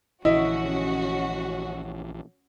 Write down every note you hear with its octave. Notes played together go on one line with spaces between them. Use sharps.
A#1 D3 E3 C#4 E4 F#4 D#5